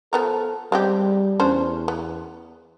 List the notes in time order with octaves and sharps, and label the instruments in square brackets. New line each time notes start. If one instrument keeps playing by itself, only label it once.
[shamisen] F3 B3 A#4 [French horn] A4
[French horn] G3 [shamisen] G#3 C4 G4
[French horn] E2 [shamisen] C#4 D4 C5
[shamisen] B3